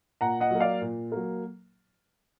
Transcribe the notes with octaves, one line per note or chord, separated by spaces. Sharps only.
A#2 F#5 A#5
D#5 F#5
F#3 A#3
D5 F5
A#2
F#3 A#3